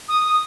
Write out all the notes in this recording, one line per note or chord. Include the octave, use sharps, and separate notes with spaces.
D#6
D#6